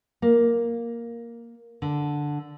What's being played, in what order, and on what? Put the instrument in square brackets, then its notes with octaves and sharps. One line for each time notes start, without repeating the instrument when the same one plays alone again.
[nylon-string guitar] A#3
D3